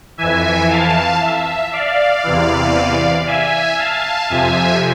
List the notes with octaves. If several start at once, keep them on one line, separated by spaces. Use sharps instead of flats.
F2 E3 E5 G#5
F5 A5
E5
D5 F5
E2 C3 E3
E5 G#5
F5 A5
F2 C3 F3 E5 G#5